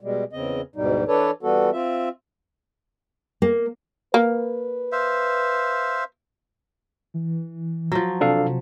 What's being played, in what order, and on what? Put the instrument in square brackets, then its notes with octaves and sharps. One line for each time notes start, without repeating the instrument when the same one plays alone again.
[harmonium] B2 G3 G#3
E2 C#3 C4 D#5
D2 G#2 B2 G3 D#4
E3 D4 A4 B4 C#5 D5
E3 G3 B3 F#4 A4
C4 F4 E5
[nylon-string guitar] A#3
[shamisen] A#3 [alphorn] B4
[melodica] C5 E5 F5
[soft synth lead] E3
[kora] F3 F#3
[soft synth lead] C3 [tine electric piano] D4 A4 F5